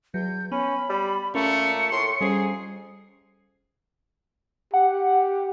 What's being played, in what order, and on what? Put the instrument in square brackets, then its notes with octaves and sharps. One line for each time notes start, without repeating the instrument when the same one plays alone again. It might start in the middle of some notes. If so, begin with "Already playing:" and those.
[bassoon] E2 [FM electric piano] F#3 [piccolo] G6
[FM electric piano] B3 [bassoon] C#4 [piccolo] B5
[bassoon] G3
[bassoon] A#2 [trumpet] A3 [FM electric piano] C#4 [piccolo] C#7
[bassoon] A2 [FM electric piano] A4 C#6 [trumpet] C6
[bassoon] F2 [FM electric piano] G3 C#4 C7 [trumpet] G#4
[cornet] G4 [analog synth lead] F#5